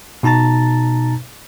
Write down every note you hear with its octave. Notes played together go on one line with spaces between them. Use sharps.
B2 D#4 A5 A#5 A6